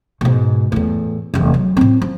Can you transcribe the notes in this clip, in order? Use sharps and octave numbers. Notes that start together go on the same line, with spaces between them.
G#2 B2
E2 A2
F1 E2
F#3
A2 C4
F3